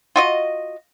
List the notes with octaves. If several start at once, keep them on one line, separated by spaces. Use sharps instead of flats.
F4 F#4 D#5